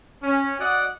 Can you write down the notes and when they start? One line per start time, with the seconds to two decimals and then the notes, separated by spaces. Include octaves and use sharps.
0.23 C#4
0.59 F#4 D5 D#5 F#5